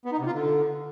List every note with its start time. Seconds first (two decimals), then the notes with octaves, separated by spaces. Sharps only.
0.05 B3
0.12 D#4
0.19 C3
0.26 F4
0.33 D3